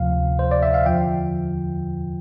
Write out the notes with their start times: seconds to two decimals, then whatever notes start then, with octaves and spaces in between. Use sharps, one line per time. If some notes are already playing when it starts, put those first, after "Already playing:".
Already playing: D2 C3 F3 F5
0.39 C5
0.51 D5
0.63 E5
0.74 F5
0.86 E2 D3 F3 G5